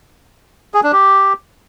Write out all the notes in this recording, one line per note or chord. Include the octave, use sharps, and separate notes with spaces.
G#4
D4
G4